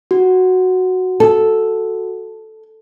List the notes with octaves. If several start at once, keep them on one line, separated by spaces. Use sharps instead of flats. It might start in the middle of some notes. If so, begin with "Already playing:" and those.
F#4
A4